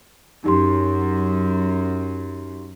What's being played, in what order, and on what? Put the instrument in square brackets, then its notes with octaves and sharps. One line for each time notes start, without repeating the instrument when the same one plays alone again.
[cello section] F#2 [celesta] D#4 G4 C6